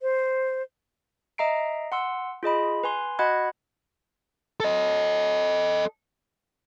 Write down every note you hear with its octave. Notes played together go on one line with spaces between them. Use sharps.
C5
D#5 E5 A#5 C7 D7
F#5 C6 E6
F4 G#4 D#5 B5
B4 G#5 C6
F#4 D#5 F#5 B5 F#6 G#6
A4 D#5